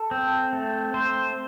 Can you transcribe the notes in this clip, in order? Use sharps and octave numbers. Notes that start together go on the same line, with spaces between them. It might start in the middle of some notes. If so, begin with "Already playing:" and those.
Already playing: A4
C4
A3
C4 C5